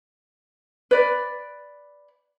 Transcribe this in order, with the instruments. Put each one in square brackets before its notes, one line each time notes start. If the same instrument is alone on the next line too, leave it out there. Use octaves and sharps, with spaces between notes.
[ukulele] B4 D5